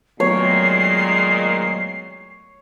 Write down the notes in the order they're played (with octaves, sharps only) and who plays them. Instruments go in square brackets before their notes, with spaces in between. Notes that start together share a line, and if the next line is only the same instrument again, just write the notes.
[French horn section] A#2 D#3 G#3 [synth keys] F#3 A3 B3 [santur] C#5 [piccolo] C7